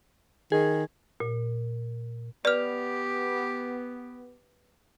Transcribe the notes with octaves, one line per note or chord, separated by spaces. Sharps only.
D#3 G#4
A#2
B3 G4 B4 D5 F6 F7